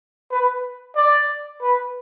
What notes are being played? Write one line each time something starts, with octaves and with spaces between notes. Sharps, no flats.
B4
D5
B4